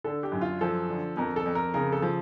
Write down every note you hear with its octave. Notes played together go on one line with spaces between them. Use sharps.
D3 A4
G4
F#2
F4
F3 A4
D3
F2 A#4
A4
F2
A#4
C#3 A#4
A4
F3